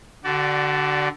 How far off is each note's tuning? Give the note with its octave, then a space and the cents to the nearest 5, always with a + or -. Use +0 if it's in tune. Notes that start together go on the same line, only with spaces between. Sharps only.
D3 +0 F#4 +35 D5 -5